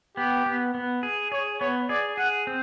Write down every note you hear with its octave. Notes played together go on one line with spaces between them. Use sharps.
B3 G4
B3
B3
G#4
G#4 C#5
B3 C#5
G#4 D5
G#4 F#5
C4